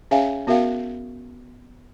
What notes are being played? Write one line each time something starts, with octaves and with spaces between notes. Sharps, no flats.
C#4 G#4 C#5 E5 F5 G#5
B3 F#4 A#4 E5 F5 G5